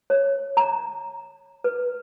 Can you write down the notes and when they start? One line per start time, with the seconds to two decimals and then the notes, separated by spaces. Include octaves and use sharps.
0.10 C#5
0.57 A#5
1.64 B4